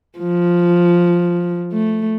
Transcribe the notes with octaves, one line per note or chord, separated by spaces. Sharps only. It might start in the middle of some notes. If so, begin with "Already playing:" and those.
F3
A3